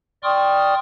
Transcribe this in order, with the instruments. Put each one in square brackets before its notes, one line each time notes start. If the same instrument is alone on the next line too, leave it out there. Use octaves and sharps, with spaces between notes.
[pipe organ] D5 G5 C6 C#6 D#6 F6